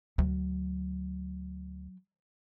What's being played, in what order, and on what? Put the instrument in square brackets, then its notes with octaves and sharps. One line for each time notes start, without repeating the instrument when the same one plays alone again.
[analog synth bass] D2 [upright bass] F#3